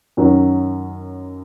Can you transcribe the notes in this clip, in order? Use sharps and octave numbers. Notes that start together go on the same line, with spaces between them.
F#2 D#3 F#3 C#4